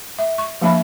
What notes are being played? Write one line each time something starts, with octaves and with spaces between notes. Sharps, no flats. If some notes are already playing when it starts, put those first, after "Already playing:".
E5
C#6
F3 A#3 D4 E5 B5